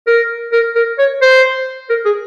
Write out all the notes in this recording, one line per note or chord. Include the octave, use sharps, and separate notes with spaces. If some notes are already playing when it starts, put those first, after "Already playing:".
A#4
A#4
A#4
C#5
C5
A#4
G#4